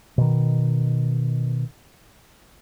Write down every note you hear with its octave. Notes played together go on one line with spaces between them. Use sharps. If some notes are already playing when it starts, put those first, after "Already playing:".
B2 D#3